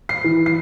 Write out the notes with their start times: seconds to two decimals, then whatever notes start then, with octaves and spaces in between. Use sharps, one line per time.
0.09 C7
0.24 E3
0.46 C7